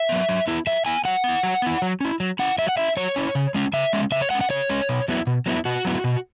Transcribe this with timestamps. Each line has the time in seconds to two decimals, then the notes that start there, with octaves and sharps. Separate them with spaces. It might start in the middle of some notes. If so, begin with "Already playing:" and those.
Already playing: E5
0.09 F#3 B3
0.29 F#3
0.48 B3 E4
0.67 F#3 E5
0.86 B3 E4 G#5
1.05 F#3 F#5
1.24 B3 E4
1.43 F#3
1.62 B3 E4
1.82 F#3
2.01 C#4 E4
2.20 F#3
2.39 C#4 E4 F#5
2.58 F#3 E5
2.69 F#5
2.77 C#4 E4 E5
2.97 F#3 C#5
3.16 C#4 E4
3.35 C#3
3.55 G#3 C#4
3.73 C#3 E5
3.93 G#3 C#4
4.12 C#3 E5
4.22 C#5
4.31 G#3 C#4 F#5
4.41 F#5
4.50 C#3 C#5
4.69 G#3 C#4
4.89 B2
5.08 F#3 B3 E4
5.27 B2
5.46 F#3 B3 E4
5.65 B2 F#4
5.85 F#3 B3 E4
6.04 B2